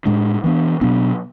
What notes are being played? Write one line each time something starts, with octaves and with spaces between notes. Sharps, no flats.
A2 G#3 D4
E3 B3 D4
B2 F#3 B3 D4